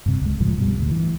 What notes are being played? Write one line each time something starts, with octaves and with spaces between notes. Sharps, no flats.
G2 C3
C#2 G#3
C#2 A2 F3 G#3
G2 B2 G3
D2
E3